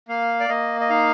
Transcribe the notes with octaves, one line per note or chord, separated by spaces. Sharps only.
A#3 F5
D5
A#3 D#5
D#5
D#4 F5